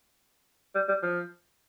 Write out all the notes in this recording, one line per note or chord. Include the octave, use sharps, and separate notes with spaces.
G3
G3
F3